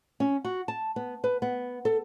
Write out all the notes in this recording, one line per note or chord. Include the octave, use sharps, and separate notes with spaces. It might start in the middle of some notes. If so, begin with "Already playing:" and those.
C#4
F#4
A5
B3
B4
B3
A4